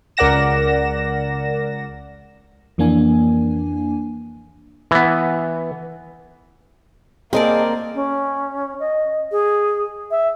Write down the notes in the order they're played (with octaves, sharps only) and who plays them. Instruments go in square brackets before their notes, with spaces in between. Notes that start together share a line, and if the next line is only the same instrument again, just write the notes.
[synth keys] C#2 A#4 D5 F#5 A#6 E7
[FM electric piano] F2 E3 A#3 D4 G#5
[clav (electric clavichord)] E3 B3
[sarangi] A#3 [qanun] C4 A#4 D5 [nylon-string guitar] G#4 D#5 A5
[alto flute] C#4
D#5
G#4
E5